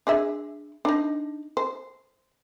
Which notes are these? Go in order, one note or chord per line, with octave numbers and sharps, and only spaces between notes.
D4 G#4 E5
D4 D#4
C5